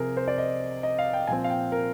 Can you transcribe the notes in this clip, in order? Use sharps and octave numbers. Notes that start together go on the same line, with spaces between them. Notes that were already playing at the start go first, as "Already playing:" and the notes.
Already playing: C3 F3 C4 G#4 A#4
C5
D5
D#5
D#5
F5
G5
A#2 F3 C4 G#5
F5
G5
A#4